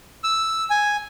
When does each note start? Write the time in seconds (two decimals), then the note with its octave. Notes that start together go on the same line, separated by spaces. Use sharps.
0.24 E6
0.70 G#5